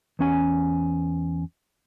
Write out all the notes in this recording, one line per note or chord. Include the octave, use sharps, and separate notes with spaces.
E2 C#4 G#5